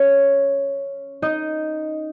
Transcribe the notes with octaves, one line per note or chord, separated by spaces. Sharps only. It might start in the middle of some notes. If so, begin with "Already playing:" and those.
Already playing: C#4 C#5
D#4 D#5